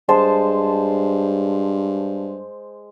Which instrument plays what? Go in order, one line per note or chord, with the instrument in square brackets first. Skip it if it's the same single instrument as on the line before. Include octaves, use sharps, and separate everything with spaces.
[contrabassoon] G2 [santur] G#3 C5 A5